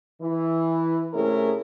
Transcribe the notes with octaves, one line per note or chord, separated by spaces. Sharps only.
E3
C3 A3 C#4 E4 G#4 A#4